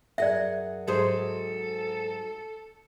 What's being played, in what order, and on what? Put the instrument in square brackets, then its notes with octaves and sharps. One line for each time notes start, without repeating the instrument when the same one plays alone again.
[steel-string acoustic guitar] F#2 G#4 F#5 [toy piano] D5 E5
[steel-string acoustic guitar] G#2 F#3 [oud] G#4 C5 [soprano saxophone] A4